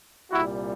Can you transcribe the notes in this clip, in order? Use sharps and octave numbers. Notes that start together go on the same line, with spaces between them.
C2 A#2 G3 E4 F#4